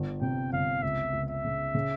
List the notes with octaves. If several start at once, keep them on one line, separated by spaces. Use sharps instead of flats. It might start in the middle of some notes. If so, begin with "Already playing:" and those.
Already playing: G1
C3 G5
G1 F5
C#2 E5
C#2
E5
C#3
C#3